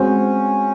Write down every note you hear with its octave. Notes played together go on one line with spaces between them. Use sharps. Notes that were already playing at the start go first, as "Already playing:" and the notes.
Already playing: G#3 C4 C#4 F#4 C5